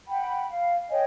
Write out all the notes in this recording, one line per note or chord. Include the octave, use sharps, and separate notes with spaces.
F#5 G5 B5
F5
C#5 D#5 G5 G#5